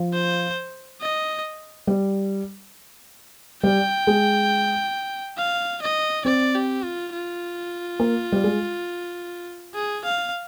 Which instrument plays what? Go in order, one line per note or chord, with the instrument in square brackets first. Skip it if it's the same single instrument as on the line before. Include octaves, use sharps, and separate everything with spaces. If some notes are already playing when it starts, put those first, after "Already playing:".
Already playing: [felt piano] F3
[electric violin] C5
D#5
[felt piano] G3
[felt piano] G3 [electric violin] G5
[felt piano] G#3
[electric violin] F5
D#5
[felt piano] C4 [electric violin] D5
[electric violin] G4
F4
F4
[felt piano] A#3
G3
G#3
[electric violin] G#4
F5